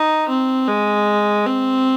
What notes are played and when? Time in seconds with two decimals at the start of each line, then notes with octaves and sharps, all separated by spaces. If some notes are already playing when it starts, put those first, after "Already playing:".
Already playing: D#4
0.29 C4
0.67 G#3
1.46 C4